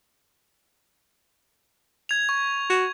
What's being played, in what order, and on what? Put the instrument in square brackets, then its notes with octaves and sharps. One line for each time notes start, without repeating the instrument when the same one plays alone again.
[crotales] G#6 F7
C#6
[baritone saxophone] F#4